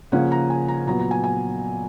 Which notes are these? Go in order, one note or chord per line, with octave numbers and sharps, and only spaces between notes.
C#3 F3 A#3 C#4 F#5
A#5
G#5
A#5
A#2 F#3 B3 A#5
A#5
G#5
G#5